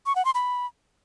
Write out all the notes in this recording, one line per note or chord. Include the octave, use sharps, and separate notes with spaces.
C#6
F#5
C6
B5